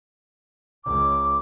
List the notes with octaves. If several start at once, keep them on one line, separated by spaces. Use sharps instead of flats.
C#2 D6